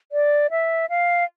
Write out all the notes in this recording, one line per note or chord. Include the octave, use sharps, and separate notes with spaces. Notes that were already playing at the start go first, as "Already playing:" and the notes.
D5
E5
F5